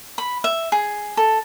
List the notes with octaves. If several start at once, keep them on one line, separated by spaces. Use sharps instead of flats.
B5
E5
G#4
A4